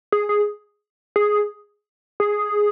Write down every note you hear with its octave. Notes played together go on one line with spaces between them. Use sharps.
G#4
G#4
G#4
G#4